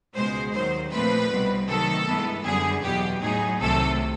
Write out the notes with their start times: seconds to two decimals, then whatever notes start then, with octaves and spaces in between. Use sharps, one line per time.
0.15 C#2 B2 G#3 C5
0.53 D#2 D#3 F#3 C5
0.92 A#2 F3 A3 C4 B4
1.29 C2 B2 G3 C4
1.68 C3 D#3 F#3 A3 A4
2.07 G2 E3 G#3 B3
2.44 F#2 D3 G3 B3 G#4
2.82 E2 B2 F#3 B3 G4
3.21 A2 F#3 B3 D#4 G#4
3.58 C2 C3 D#3 F#3 A3 A4